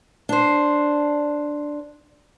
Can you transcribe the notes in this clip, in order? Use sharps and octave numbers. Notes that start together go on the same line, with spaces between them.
D4 C5